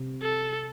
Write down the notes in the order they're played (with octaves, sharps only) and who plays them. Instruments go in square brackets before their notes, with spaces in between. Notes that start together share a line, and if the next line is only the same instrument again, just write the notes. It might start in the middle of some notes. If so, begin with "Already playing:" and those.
Already playing: [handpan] C3
[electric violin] A4